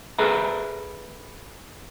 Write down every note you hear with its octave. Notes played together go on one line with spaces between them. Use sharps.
G#4 A4 B4 E5 A#5